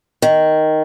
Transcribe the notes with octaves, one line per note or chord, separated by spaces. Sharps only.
D#3